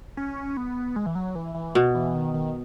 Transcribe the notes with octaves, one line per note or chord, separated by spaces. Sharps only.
C#4
B3
G#3
E3
F#3
E3
E3
B2
E3
D#3
D#3